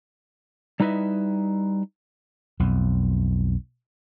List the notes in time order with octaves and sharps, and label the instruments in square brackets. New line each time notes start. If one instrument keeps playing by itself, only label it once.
[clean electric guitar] G3 D#4 E4 B4 D#5 E5
[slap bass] B1 F2